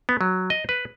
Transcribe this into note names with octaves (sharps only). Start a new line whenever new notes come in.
B3
F#3
D#5
B4